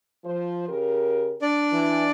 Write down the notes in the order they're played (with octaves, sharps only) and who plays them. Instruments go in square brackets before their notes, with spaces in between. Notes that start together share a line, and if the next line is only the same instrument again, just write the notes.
[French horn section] F3 C5
C#3 G4 A#4
[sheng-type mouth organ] D4 D5
[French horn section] E3